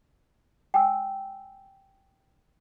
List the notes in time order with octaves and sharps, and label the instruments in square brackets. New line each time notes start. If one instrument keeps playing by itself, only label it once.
[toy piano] G5 G#5 E6